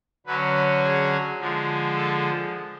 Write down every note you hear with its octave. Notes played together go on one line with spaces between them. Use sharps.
D3 F#3 C#4 B4
B4
G#4
D3 F3 G#3
A4